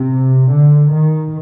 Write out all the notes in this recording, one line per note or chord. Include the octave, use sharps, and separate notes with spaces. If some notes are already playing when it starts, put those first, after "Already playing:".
Already playing: C3
D3
D#3